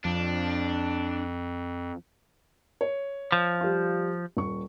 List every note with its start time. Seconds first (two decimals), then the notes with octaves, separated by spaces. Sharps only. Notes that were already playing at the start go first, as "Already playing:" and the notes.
0.05 F2 D4
2.81 C#5
3.32 F3
3.61 G3 F4
4.37 D#1 C#6